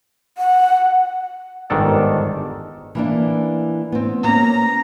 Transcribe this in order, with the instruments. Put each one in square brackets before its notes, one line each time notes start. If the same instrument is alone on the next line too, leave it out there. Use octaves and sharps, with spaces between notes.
[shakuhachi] F#5
[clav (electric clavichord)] G1 G#2 D#3 D4 A4 D5
[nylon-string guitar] E3 A#3 D4
B3 C4
[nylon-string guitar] A#3 C#4 [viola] A#5